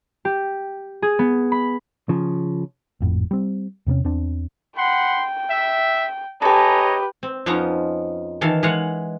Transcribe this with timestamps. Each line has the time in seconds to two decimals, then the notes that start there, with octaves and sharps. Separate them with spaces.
0.25 G4
1.02 G#4
1.19 B3
1.52 B5
2.09 C#3 F3
3.00 G#1 F2 A2
3.31 G3 C4
3.86 E2 C3 A#3 C#4
4.04 E2 C4 D4
4.77 F#5 G5 B5 C6
5.51 E5
6.42 G4 A4 B4 C#5 D#5 G#5 A#5
7.23 C4
7.46 F2 F3 B3 C#4 D#4 A#5
8.41 D#3 E3 A4 F5
8.63 E3 G#3 C#5 F5 F#5